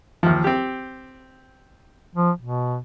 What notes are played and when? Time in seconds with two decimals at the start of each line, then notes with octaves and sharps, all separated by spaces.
0.23 D#2 F3
0.44 C4 G4
2.15 F3
2.41 B2